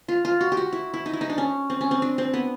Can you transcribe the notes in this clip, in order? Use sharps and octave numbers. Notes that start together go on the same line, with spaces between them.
F4
F4
F#4
G4
F#4
E4
E4
D#4
E4
D#4
D4
C#4
C4
C#4
C4
D4
C4
B3